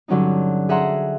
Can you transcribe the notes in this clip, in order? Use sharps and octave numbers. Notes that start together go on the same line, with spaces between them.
G2 D3 F#3 C#4 D#4
G#4 E5 F#5 A#5 C6